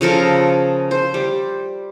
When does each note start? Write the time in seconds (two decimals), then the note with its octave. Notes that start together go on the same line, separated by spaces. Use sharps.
0.01 C#3 F3 A4 A#4
0.91 C5
1.14 G3